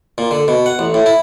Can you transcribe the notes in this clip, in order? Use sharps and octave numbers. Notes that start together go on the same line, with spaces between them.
A#2
D3
B2
F#5
A1
A2
E4